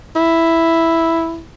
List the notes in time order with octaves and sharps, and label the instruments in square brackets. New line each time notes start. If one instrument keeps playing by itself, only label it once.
[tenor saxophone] E4